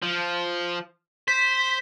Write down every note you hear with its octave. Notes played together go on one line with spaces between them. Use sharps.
F3
C5 B6